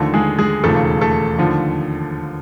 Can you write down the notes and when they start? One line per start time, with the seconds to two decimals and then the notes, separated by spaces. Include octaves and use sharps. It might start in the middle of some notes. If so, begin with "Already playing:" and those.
Already playing: D#2 D3 F3 A3 A4
0.14 G#3 G#4
0.38 G#3 G#4
0.64 E1 D#2 C#3 F3 A3 A4
1.01 A3 A4
1.39 D#2 D3 F3